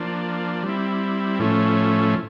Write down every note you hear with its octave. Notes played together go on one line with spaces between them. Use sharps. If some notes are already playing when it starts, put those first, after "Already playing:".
Already playing: F3 A#3 D4
G3 C4 E4
A2 F3 A3 C#4